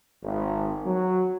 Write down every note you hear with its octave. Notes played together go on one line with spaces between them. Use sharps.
G#1
F#3